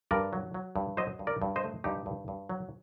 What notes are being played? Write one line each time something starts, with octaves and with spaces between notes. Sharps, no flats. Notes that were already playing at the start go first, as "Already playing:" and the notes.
G2 A#4 D5
F#3
F#3
G2
F#3 C5 D#5
G2
A#4 D5
G2
C5 D#5
A3
G2 D#4 G4
G2
G2
F#3